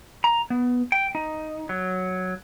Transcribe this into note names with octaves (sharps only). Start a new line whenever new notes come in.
A#5
B3
G5
D#4
F#3